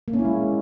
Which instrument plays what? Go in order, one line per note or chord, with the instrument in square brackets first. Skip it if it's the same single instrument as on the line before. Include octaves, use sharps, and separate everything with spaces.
[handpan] A#3
C#4
E4
G#3